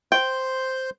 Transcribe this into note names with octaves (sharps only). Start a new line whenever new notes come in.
C5 G5 C6 G6